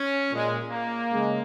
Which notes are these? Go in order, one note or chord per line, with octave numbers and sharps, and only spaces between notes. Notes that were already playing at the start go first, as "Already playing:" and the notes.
Already playing: C#4
A#2 G#3
A#3
C#3 G#3